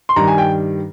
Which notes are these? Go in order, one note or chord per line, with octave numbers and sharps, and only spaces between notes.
C6
G2 D#3 G3 A#5
G#5
G5